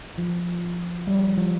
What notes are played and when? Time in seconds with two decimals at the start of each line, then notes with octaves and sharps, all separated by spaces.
0.18 F3
1.07 G3
1.18 F3
1.23 G3
1.38 F3